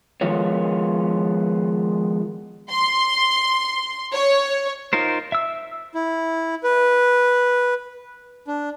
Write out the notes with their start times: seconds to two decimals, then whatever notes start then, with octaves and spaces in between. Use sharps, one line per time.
0.21 D#3 F3 G#3 B3 F4 C#5
2.70 C6
4.14 C#5
4.93 D#4 F4 A#4 C5
5.32 E5 E6
5.94 E4
6.63 B4
8.47 D4